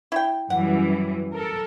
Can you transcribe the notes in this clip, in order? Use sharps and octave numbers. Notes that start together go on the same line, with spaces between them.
E4 G5
F#2 E3 G3 F#5
A4 A#4